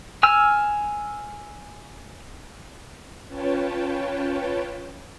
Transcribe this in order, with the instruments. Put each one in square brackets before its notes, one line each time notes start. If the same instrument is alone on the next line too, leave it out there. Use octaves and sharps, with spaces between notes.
[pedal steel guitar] G#5 E6 F6
[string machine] C#4 F4 B4 C#5 G5 A5